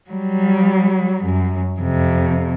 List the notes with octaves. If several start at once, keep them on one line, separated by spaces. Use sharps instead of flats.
F#3 G3
F#2
F2 C3